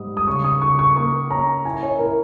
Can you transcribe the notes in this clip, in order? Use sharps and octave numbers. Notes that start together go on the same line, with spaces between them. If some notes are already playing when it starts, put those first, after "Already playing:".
Already playing: G#2 G3 D#6
D#6
C#3 C#6
D#6
C#3 C#6
C#6
A#3 C#6
C#4 A#5
E4 G#5
C#5
E4 A#4